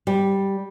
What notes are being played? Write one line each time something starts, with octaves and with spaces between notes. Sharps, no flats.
G3